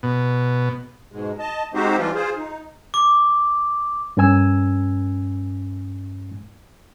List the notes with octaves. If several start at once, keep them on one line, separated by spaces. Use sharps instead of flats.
B2
G#2 B2 G#3
D#5 A5
G#3 C4 D#4 F#4 G4 C5
E3 F3 G3 F4
F4 G#4 C5
D#4
D6
G2 C#4 A#4 G#5 E6